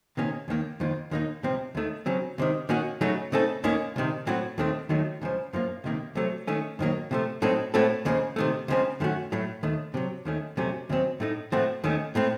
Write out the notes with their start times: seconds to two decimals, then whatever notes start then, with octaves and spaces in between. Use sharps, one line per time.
0.17 C3 D#3 A#3 C#4
0.48 D#2 D#3 A#3
0.80 F2 D#3 A#3 F4
1.11 D#2 D#3 A#3 D#4
1.43 C#2 C3 F3 C4
1.75 D#2 D#3 A3
2.06 C#3 F#3 C4
2.38 C#2 C3 D#3
2.69 D#3 A#3 C#4 F#4
3.01 C#3 F#3 A3 D#4 F#4
3.32 C#3 A3 C4 D#4 A4
3.64 D#2 D#3 A#3 C#4
3.96 C2 C3 D#3
4.27 A2 F#3 C4 F#4
4.58 D#2 D#3 A3 C4
4.89 D#2 D#3 F#3 A3 D#4
5.22 C#2 C#3 F3
5.53 F#2 F3 A#3 F4
5.84 C#2 C3 D#3 A#3
6.15 C2 C3 F#3 A3
6.47 D#3 A3 C#4
6.79 F2 D#3 F#3 A#3
7.11 C3 F3 A3
7.42 A2 F#3 C4 D#4 A4
7.74 A2 A3 C4 F#4 A4
8.05 D#2 C#3 F3 A#3
8.36 C3 D#3 A3
8.68 C#2 C#3 F3 C4
9.00 F#2 D#3 A3 C#4 F#4
9.32 A2 F#3 A3
9.63 D#2 D#3 A3
9.94 C3 D#3 F#3
10.25 D#2 D#3 A3 C#4
10.57 F2 C3 F#3 A3 C#4
10.89 D#2 C#3 F#3 C4
11.20 A2 A3 D#4
11.52 A2 F3 A3 C4 F#4
11.84 D#2 D#3 A3 C#4
12.15 A2 A3 C4